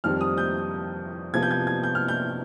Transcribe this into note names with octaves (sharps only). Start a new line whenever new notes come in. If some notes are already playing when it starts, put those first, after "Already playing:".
F2 D#3 G3 C4 F6
D#6
G6
C3 F3 B3 G#6
G6
G#6
G#6
G6
F6
G6